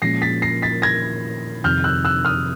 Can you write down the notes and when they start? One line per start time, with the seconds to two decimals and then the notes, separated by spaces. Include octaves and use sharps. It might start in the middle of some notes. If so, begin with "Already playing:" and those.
0.02 A#2 F3 G#3 C#4 A#6 C7
0.22 A6 B6
0.42 A#6 C7
0.62 A6 B6
0.82 G#6 A#6
1.64 F2 C3 D#3 F6 G6
1.84 E6 F#6
2.05 E6 F#6
2.25 D#6 F6